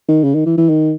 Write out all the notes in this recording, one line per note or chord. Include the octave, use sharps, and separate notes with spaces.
D#3
C#3
D#3
E3
E3
D#3